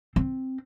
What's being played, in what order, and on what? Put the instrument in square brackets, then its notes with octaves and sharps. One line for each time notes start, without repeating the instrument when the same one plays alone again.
[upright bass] C4